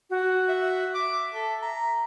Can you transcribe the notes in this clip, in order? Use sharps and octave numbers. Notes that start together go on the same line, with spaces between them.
F#4
E5
E5 D6
A4
A#5